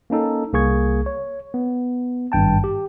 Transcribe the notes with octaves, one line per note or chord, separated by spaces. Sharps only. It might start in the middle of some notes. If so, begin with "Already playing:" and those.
A#3 C#4 D#4 A4
C2 A#3 G#4 C#6 G#6
C#5
B3
G#1 G2 G5 A5
G4